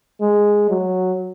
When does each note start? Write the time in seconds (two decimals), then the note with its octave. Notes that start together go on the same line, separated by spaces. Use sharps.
0.21 G#3
0.69 F#3